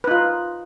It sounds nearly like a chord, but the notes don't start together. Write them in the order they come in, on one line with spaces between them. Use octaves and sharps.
B4 D#4 F4